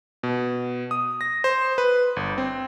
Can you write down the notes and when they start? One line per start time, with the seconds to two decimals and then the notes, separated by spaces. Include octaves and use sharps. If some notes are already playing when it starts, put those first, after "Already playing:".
0.23 B2
0.91 D#6
1.21 A#6
1.44 C5
1.78 B4
2.16 G1
2.38 C4